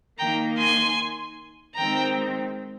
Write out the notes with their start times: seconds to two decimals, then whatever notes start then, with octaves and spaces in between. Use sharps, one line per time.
0.18 D#3 A#3 G5 A#5
0.58 G#5 C6
1.76 D#3 G#3 C4 G5 A#5